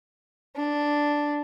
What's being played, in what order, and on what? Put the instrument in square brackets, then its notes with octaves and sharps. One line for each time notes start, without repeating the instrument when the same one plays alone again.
[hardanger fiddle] D4